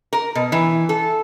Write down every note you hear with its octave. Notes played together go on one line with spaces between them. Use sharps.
A#4
B2
E3
A4